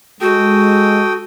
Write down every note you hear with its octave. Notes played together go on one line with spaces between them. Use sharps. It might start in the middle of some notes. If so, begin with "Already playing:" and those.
G#3 F#4 A4 G5 D#6